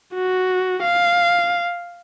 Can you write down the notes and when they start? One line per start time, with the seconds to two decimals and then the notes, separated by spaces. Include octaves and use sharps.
0.14 F#4
0.83 F5